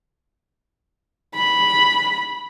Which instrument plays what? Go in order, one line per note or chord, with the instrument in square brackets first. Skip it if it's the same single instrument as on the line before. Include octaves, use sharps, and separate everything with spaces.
[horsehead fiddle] B5